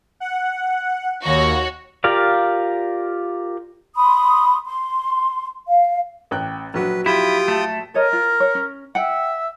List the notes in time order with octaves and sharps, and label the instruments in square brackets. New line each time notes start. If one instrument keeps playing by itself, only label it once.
[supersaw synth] F#5
[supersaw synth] D#2 A#6 [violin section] F#4 C#5
[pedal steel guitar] F4 G4 A#4 D5 F5
[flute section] B5 C6 D#6
C6
F5
[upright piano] A1 G5 F#6
[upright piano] A#1 F#3 F#4 [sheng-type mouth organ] B4
[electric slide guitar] E4 [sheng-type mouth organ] F4 G5 D#6 [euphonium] G4
[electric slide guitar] A3
[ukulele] A4 C#5 D#5 [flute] A#4
[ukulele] F4
C#5
C#4
[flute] E5 [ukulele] F#5 G5